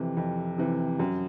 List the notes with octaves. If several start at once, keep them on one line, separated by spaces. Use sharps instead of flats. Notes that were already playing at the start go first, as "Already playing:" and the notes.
Already playing: F2 C3 E3
F2
C3 E3
F#2